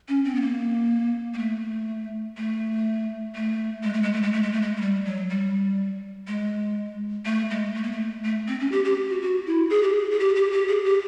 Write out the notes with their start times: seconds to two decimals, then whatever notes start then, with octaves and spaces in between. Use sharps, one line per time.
0.09 C#4
0.25 C4
0.35 B3
0.41 A#3
1.34 A#3
1.38 A3
2.37 A3
3.35 A3
3.84 G#3
3.94 A3
4.02 G#3
4.13 A3
4.22 G#3
4.33 A3
4.43 G#3
4.53 A3
4.62 G#3
4.76 G#3
4.81 G3
5.05 F#3
5.30 G3
6.28 G#3
7.26 A3
7.50 G#3
7.75 A3
7.83 A#3
7.92 A3
8.23 A3
8.48 C4
8.60 C#4
8.72 G4
8.85 G4
9.10 F#4
9.22 F#4
9.46 E4
9.70 G#4
9.83 G4
9.96 G#4
10.11 G#4
10.20 G4
10.36 G4
10.52 G4
10.68 G#4
10.85 G4